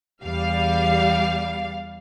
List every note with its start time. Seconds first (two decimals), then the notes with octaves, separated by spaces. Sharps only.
0.24 E2 G3 F5